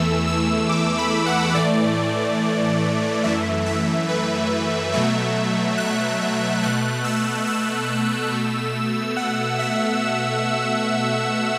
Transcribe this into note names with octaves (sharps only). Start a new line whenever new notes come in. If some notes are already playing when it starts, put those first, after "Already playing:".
Already playing: E2 E3 A3 E6
E6
D6
B5
F#5
A2 E3 A3 D5
F#2 E3 A3 E5
E5
B4
B2 F#3 A3 E5
F#6
B2 A3 F#6
E6
E6
B2 A3
F#5
E5